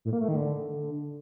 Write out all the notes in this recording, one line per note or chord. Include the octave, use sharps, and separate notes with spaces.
A2
A#3
A3
D#3
D3